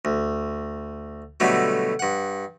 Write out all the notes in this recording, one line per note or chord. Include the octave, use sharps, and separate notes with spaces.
D2
B2 D3 F#3 G3 A3
G2 F#5